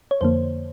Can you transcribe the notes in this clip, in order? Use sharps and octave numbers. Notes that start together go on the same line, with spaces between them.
C#5
F2 D3 F3 A#3 C5